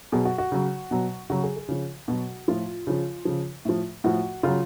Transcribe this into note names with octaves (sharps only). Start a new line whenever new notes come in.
B2 F#3 G#4
F#4
F#4
C#3 F#3
B2 F#3
C#3 F#3 F#4
G#4
G#4
C#3 F3
B2 F#3 F#4
A2 F3 F4
C#3 F3
C#3 F3
A2 F3
A2 F3 F#4
C#3 F#3 F4